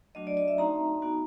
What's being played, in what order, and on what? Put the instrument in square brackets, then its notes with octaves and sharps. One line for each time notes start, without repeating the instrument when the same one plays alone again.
[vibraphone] F#3 A3 D4 F#4 D#5
D5
D#5
E5
A3 C4 D#4 F#4 A#5
B3 D#4 F#4